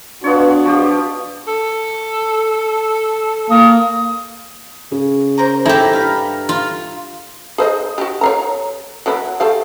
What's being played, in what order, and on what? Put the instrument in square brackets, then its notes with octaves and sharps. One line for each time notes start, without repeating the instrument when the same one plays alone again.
[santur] B3 F4 C#5 [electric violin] D4 F#4
[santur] F3 G4
[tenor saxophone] A4
[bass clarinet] A#3 [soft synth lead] D#6
[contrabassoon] C#3 [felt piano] G#4
[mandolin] A#4 C5 A#5
[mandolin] C4 [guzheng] E4 G4 [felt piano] A4 A#5
[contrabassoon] G2 [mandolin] F5 B5
[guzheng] F4
[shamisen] G#4 C5 D#5
F#4 G4
C#5 F5 A#5
F#3 B3 E4
A3 G4 F5